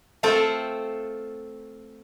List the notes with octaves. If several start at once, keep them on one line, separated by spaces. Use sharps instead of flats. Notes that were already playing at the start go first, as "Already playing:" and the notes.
A3 C4 F4 A4 C5 G5